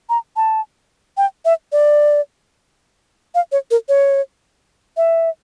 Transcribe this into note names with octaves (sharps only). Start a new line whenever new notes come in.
A#5
A5
G5
E5
D5
F5
C#5
A#4
C#5
E5